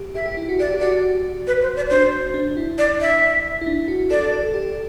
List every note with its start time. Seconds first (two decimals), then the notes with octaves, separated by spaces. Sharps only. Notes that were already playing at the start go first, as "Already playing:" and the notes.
Already playing: G4
0.15 G4 E5
0.26 G4
0.37 E4
0.49 F#4
0.59 G4 D5
0.74 G4
0.81 F#4 D5
1.47 B4
1.62 C5
1.76 D5
1.90 D4 C5
2.34 D4
2.57 E4
2.78 D5
3.01 E5
3.61 E4
3.66 D4
3.88 F#4
4.10 A4 D5
4.32 A4
4.54 G4